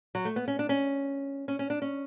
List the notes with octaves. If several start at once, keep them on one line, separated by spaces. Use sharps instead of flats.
F#3
A3
B3
C#4
D4
C#4
C#4
C#4
D4
C#4